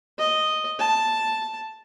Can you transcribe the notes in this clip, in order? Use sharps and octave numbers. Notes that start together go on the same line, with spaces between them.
D#5
A5